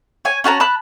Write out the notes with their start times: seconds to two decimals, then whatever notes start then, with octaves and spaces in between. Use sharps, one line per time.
0.25 C#5 G#5
0.44 C#4 F#4 A5 A#5
0.60 A5 B5 F#6